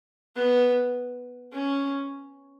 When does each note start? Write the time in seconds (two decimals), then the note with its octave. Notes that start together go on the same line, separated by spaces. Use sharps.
0.36 B3
1.53 C#4